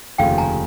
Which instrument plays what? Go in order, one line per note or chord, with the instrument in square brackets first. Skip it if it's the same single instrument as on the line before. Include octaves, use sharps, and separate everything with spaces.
[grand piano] F1 D#2 C#3 F3 A3 [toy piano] F5 G5
[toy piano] G#5 A#5